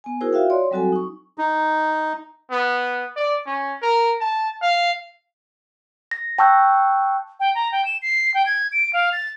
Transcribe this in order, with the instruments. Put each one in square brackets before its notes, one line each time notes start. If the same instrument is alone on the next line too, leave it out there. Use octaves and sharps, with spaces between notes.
[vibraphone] B3 G#5
D#4 E4 F#4 G#4 A#4 C5
F4 F#4 E5 F5 G5
C#5 D5 C6
F#3 G3 C4 F#4 A4 G#5
D#4 C#6
[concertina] D#4
[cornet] B3
D5
C#4
A#4
A5
F5
[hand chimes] A#6
G5 A5 C#6 E6 F#6 G6
[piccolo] G5
A#5
G5
E7
C7
G5
G#6
D7
F5
A6